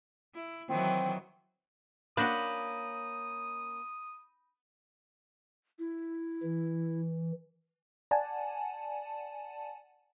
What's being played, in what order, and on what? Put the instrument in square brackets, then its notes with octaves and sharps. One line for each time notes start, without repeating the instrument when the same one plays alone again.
[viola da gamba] E4
[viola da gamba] D#3 E3 F#3 [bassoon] C4
[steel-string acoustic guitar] A#3 C#4 [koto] D4 F#4 [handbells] B5 G6 A#6 [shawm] D#6
[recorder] E4
[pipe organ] E3
[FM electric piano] D5 F#5 G#5 A5